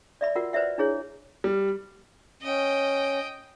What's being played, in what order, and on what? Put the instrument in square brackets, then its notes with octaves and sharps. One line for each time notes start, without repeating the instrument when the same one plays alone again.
[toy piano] D5 E5 B5
F4 F#4 A#4 F#5
B4 C5 D5 E5 F#5
D4 E4 G#4 C#5
[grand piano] G3
[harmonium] C#4 [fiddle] D#5 G5